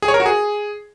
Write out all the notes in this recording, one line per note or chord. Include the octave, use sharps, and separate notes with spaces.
G#4
C#5
A#4
F#4
G#4